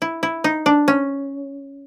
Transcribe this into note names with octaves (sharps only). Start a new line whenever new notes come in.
E4
E4
D#4
D4
C#4